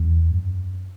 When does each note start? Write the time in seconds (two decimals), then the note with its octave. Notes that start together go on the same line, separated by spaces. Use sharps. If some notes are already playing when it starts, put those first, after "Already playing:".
Already playing: E2
0.31 G2
0.36 F#2